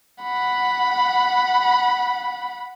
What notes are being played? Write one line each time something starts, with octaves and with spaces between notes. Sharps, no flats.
F#5 B5